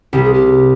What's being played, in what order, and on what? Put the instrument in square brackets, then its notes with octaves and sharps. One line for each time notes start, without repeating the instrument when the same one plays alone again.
[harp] C2 C3 G3 [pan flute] G4
[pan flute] G#4
G4